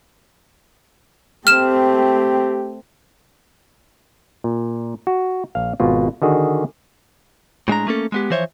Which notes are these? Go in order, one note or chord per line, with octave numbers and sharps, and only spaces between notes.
A3 C4 G4 F6 E7
A#2
F#4
A#1 F5
G#1 B2 F4
D3 D#3 F#4 G#4
A2 G#3 D4 A#5
A3 A#3 C#4 A4
G#3 B3 G4
E3 F3 C5 C#5 E5